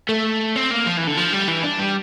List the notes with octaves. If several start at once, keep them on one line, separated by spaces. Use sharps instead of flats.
A3
C4
A#3
F3
E3
D3
F3
G3
E3
D4
G3